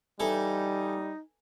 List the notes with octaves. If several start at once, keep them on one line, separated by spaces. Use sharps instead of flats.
E3 G3 D#4 A4